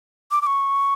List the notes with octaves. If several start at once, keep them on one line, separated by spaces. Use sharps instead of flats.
D6
D6
C#6